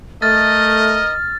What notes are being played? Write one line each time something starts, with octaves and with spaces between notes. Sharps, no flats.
A3 A#4 D#5 F6 A6